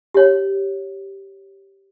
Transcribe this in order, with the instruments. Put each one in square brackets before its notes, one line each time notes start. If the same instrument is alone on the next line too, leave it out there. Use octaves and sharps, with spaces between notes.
[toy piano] G4 C#5